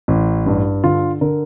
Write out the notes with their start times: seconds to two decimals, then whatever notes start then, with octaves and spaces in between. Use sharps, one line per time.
0.08 A1
0.46 G2
0.84 D3 F4
1.21 D3 A#4